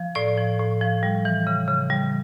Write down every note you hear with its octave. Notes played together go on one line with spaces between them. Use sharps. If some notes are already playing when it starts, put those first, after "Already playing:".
Already playing: F3
A2 D5
F3
A2
F3
G3
E3
C#3
C#3
G3